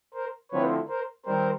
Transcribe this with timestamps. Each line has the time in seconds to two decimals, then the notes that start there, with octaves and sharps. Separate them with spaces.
0.14 A#4 C5
0.52 D3 F3 A3 C4 E4 B4 C#5
0.88 A#4 C5
1.26 D#3 G3 C4 A#4 C5